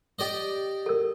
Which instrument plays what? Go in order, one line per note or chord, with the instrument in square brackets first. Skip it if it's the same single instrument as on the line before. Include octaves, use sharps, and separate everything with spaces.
[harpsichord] G4 D5 D#5
[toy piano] A4 A#4